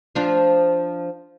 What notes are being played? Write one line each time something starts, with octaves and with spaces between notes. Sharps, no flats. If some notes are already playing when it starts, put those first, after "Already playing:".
F3 D4 F4